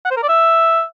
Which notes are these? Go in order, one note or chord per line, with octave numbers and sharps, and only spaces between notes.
F#5
C5
A#4
D5
E5